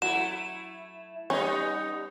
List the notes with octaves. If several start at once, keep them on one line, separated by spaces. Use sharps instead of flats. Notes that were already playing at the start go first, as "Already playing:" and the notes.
F#3 A3 E4 E7
G3 B3 C#4 D#4